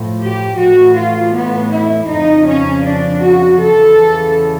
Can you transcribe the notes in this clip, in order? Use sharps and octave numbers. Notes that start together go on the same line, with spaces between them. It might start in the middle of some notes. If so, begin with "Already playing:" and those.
Already playing: A2 F3
G4
A2 E3 F#4
F4
B3
E4
F2 C#3 F3 D#4
C#4
D4
F#4
E2 C#3 E3 A4